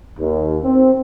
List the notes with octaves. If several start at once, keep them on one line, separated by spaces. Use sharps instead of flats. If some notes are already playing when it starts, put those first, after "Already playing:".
D#2
C4